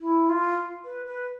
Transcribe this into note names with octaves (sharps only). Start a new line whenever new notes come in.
E4
F4
B4
B4